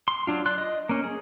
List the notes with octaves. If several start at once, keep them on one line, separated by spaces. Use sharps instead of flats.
C6
F#3 D4 F4
D5 C6 F#6
D#5
A#3 C#4
G#4